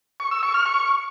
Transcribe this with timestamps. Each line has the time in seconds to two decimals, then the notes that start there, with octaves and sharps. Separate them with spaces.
0.20 C#6
0.31 E6
0.43 C#6
0.54 F6
0.66 C#6